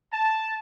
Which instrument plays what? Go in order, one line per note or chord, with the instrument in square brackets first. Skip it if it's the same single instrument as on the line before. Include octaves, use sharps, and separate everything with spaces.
[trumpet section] A5